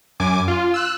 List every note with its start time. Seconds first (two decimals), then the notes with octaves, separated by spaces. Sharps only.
0.20 F#2 G#5 D6
0.48 F4
0.74 E6 F#6